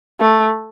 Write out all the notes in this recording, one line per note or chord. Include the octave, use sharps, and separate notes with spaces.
A3